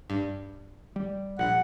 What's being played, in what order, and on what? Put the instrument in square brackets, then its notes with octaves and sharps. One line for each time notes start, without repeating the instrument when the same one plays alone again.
[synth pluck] G2
[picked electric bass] G3
[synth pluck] A#1 [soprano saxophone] F#5